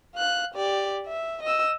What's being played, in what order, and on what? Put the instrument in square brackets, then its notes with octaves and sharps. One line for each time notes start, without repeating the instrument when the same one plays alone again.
[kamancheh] F5 F#6
G4 D5
E5
D#5 E6